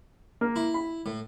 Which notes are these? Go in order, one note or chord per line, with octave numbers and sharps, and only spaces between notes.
A#3
E4
B5
A2